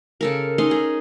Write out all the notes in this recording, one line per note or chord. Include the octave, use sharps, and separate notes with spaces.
C#3 A4 A#4
C#4 D#4 D#5 C6
G#4